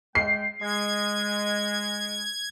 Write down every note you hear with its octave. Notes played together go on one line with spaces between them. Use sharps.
G#3 G5 C7
G#3 G#6